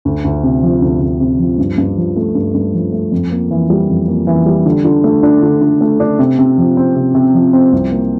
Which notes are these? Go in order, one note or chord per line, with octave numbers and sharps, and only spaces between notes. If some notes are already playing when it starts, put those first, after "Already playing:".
D2
D2
C3
F3
D2
D2
C3
F3
G2
G2
F3
A3
G2
G2
F3
A3
F2
A#3
E3
G3
F2
A#3
E3
G3
D3
D3
A3
D4
D3
D3
A3
D4
C3
C3
F3
C4
C3
C3
F3
C4
C2
A#3